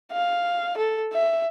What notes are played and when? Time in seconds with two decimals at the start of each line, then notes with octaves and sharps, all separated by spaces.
0.13 F5
0.77 A4
1.13 E5